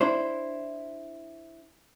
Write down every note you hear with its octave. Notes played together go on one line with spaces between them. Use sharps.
D4 E4 C5